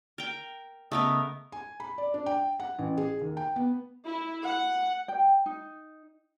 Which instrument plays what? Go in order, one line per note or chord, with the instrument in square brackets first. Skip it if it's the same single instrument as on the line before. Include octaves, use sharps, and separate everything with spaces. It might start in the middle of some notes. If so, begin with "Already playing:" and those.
[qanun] A#4 G5
[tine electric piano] C#3 [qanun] A3 B3 A#4 [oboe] D#5
[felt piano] G#5
B5
D5
D4
G5
F#5
A1
G#4
D#2
G5
B3
[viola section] E4
F#5
[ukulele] G5
D#4